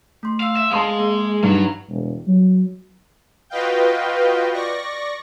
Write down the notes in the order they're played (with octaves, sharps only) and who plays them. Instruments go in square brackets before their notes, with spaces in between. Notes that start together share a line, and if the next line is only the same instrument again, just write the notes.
[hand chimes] A3 C6
[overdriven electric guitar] F5 [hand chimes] C6 E6
[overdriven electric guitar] E5 [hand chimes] F5
[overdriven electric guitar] G#3 [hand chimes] F5 [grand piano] A5 C6 D#6
[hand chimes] A#3 G#4
[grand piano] G2 [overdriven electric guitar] F#3 [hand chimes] D#4
[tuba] E1
F#3
[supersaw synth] F4 F#4 B4 D#5 F5 G5
D5 C#6 A#6